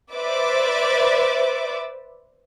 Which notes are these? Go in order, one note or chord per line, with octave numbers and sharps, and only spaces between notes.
B4 C5 D5 E5 D6